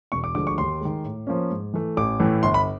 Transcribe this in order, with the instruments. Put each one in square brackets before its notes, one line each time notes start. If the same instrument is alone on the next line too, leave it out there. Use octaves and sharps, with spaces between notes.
[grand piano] E1 C#6
D6
D2 D3 F3 G#3 D6
C#6
D#2 C6
D#3 G#3
A2
F3 A#3 C#4
G#2
E3 A3
A1 D6
A2 E3 A3
G1 C6
B5